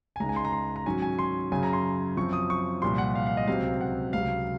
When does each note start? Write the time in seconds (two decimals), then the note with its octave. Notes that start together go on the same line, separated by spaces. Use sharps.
0.16 G#5
0.20 C#2 C#3 G#3 D#4 A#5
0.29 G#5
0.36 C6
0.45 A#5
0.53 C6
0.76 A#5
0.86 G#2 D#3 F#3 C#4 G#5
1.02 G#5
1.19 C6
1.52 F#2 C#3 F#3 G#5
1.63 A#5
1.73 C6
2.17 F#2 F3 C4 C#6
2.33 D#6
2.50 C#6
2.82 C2 A#2 F3 C6
2.98 F#5
3.15 F5
3.27 F5
3.37 D#5
3.48 C#2 C3 F#3 C4 F5
3.81 F#5
4.13 C#2 C3 F#3 F5